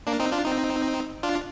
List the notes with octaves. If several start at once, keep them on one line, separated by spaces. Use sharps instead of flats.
A#3 D4
C4 D#4
D4 F4
C4 D#4
D4 F4